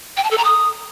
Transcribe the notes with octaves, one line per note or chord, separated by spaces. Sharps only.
G5
A5
A4
A#5
D#6